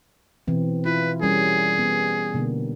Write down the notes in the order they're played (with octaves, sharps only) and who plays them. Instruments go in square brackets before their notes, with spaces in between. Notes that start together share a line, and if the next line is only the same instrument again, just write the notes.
[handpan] B2 E3 C4
[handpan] E4 F4 [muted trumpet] B4
[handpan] G3 C#4 A#4 [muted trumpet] G#4
[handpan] B3
B2 D3 A#3